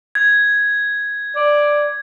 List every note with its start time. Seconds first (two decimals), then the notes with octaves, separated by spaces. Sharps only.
0.15 G#6
1.36 D5